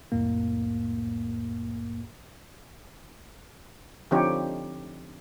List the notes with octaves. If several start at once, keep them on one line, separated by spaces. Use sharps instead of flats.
C2 F2 A2 A#3
D3 F3 C4 D#4 G4 C#5